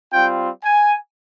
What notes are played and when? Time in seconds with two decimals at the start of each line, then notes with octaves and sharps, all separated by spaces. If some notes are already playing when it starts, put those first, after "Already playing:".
0.12 G3 C4 F4 G5
0.63 G#5